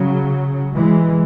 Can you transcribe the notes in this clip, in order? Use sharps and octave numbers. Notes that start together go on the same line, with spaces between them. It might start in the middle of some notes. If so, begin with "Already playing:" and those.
Already playing: C#3 F#3
E3 G#3